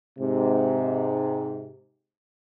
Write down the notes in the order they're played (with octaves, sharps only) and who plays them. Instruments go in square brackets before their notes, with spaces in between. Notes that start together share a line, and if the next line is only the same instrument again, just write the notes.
[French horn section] G#2 C3